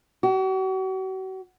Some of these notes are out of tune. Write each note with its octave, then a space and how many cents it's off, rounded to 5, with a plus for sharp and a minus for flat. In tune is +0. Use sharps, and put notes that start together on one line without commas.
F#4 +40